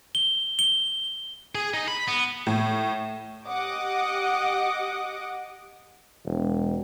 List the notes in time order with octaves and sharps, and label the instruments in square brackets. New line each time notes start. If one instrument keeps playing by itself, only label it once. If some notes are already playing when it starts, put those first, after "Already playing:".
[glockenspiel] G7
G7
[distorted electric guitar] G#4
D#4
B5
B3
[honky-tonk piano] A2
[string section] G4 D#5 F#5 D6 D#6
[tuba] E1